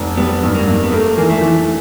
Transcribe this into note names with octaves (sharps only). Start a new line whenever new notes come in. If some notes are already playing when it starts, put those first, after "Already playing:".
Already playing: F1
G3 B3
G2
A#3
G2
B3
A3 A#3
E3 A#3
A3
E3